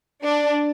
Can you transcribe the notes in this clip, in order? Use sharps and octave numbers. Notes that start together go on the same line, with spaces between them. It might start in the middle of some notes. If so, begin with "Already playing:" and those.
D4